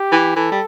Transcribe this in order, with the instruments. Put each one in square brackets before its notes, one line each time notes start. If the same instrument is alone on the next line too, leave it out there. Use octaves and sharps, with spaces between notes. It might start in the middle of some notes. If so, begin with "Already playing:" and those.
Already playing: [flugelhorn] G4
[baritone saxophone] E3
[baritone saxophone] E3 [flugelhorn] A4
[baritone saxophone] G3